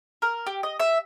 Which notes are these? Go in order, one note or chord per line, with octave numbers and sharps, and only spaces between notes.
A#4
G4
D#5
E5